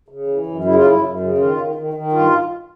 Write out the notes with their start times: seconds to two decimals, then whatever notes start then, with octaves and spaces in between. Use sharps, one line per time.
0.09 C#3
0.27 E3
0.46 F#2
0.64 C#3 E4
0.75 F4
0.83 F#2 E4
1.01 F#2
1.20 C#3
1.38 D#3 F4
1.57 D#3
1.76 D#3
1.94 D#3
2.12 G2 F4